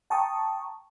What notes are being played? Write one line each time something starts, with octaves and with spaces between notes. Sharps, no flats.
G5 A5 A#5 C#6 D#6